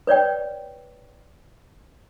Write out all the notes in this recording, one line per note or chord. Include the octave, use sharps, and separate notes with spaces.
B4 C#5 D5 G5